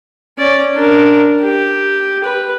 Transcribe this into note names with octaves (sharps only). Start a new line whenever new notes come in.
C#4 D5
D4 A#4
G4
B4